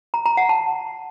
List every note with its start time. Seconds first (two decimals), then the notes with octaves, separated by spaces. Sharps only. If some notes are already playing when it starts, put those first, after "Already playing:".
0.14 A#5
0.26 A#5
0.37 F#5
0.49 A5